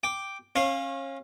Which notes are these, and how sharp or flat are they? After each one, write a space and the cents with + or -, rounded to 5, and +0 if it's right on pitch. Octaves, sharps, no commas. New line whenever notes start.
G5 +0 D6 +0
C#4 -30 C#5 -35 F5 +0